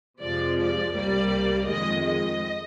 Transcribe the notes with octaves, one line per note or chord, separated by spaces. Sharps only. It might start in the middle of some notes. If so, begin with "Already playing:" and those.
F2 C3 F3 G#3 D5
D5
C2 C3 G3 A#3 D5
F2 D#3 G#3 D#5
D#5